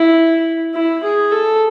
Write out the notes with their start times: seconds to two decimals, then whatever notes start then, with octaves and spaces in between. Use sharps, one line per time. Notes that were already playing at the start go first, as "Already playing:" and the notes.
Already playing: E4
0.75 E4
1.03 G#4
1.32 A4